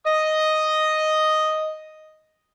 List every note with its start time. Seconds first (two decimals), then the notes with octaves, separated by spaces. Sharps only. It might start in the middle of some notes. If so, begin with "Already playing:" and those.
0.07 D#5 D#6